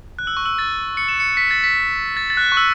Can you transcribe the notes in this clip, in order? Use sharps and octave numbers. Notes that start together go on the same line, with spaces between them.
F#6
E6
C#6
E6
A6
C#7
E7
C#7
B6
A6
B6
A6
A6
F#6
C#6
E6